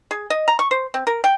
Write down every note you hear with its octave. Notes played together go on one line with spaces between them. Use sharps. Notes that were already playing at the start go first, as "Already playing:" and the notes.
G#4
D#5
A#5
C#6
C5
C4
A#4
G5